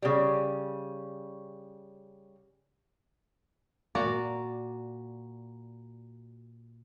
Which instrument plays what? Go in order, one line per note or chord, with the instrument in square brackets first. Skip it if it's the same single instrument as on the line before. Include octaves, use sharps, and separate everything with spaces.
[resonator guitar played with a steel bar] C#3 G3
[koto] A#2 F#4 D5 A#5